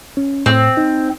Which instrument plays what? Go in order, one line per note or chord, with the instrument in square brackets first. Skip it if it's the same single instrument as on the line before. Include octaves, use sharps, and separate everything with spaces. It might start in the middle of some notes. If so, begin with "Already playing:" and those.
[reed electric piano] C#4
[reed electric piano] A2 [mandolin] C4
[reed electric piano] D#4